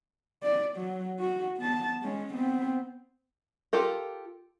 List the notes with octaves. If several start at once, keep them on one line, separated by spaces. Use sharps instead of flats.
D5
F#3
F#4
B3 A5
G#3 C#4
B3 C4
F4 G4 A4 A#4